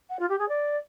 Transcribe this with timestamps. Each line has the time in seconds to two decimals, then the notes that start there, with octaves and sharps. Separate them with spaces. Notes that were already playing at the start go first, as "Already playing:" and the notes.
0.09 F#5
0.19 F4
0.29 G4
0.39 G#4
0.48 D5